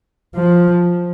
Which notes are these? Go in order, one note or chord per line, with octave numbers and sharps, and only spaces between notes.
F3